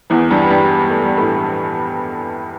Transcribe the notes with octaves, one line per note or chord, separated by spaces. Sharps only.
E2 E3
G2 G3
G2 G3
A3
G3
A2 A3